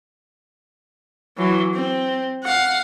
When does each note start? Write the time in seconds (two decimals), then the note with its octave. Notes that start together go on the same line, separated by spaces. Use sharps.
1.37 E3 F#3
1.74 C4
2.44 F5 F#5